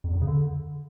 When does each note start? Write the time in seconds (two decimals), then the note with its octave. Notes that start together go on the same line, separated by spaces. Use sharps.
0.04 F2
0.10 E2
0.16 F2
0.22 C#3
0.27 D3